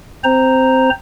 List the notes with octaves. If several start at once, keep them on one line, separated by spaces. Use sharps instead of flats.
C4 C5 A#5